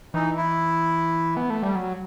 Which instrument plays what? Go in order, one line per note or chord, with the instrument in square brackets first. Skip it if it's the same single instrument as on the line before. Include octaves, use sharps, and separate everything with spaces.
[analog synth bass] E3 [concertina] D#4
[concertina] E4
[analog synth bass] B3
A3
G3
F#3